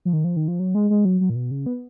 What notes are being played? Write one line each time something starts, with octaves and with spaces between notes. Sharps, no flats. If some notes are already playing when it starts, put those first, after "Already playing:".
F3
D#3
F3
D#3
F3
F#3
G#3
G#3
F#3
F#3
A#2
B2
C#3
B3